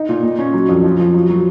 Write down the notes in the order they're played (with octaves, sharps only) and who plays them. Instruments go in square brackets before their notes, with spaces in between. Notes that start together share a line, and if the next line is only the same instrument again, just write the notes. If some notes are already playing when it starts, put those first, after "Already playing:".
Already playing: [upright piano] D#4
A#2
A#2
C#4
F#3
F2
F3
F3
F#3
F#3